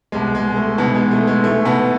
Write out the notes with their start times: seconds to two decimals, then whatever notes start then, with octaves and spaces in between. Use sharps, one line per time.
0.12 C2 B2 G#3
0.35 G#3
0.56 A3
0.78 G#2 B2 E3 B3
0.95 G#3
1.11 A3
1.27 G#3
1.43 G#2 E3 A3
1.65 B2 B3